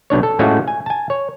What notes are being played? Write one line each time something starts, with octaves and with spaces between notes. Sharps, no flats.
B1 B2 D4 C#5
A4
A2 G#3 A3 C#4 F4 F#4
G#5
G#5 A5
C#5